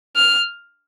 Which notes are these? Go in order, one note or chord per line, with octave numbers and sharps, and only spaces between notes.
F6